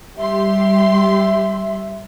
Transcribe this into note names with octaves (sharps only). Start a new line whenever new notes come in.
G3 G4 E5 C6